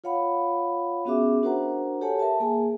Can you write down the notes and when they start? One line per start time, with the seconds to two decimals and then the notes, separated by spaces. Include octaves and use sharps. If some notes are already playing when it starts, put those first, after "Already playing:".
0.04 F4 C#5 F5 F#5 B5
1.05 B3 C#4 F#4 G#4 E5 D6
1.43 D4 F#4 A#4 C5 F#5 A#5
2.01 G4 A4 C#5 F#5 G#5 A5
2.19 A#4 E5 A5
2.40 A#3 G#4 G#5